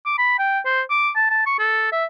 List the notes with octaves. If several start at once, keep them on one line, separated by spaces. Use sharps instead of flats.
D6
B5
G5
C5
D6
A5
A5
C#6
A4
E5